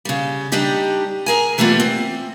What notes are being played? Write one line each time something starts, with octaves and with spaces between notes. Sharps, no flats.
C#3 G3
G3 D4 D#4 G4 D#5
G#4 A#4 G#5
E3 G3 A3 B3 F4
C4